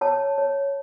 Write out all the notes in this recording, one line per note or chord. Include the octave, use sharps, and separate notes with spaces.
C#5 A5
C#5